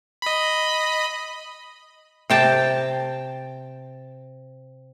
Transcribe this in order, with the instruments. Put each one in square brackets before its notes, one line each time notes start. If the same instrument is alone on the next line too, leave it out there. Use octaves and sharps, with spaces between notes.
[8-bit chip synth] D#5 B5
[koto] C3 G5 A5